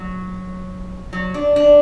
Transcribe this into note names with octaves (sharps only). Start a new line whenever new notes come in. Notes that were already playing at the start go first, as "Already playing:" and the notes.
Already playing: F#3
F#3
D4
D4